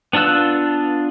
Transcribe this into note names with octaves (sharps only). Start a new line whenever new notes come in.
B3 D4 F4 E6 F#6